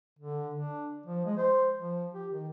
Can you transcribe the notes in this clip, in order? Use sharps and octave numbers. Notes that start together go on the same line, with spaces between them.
D3
D4
F3
G#3
C5
F3
G4
D#3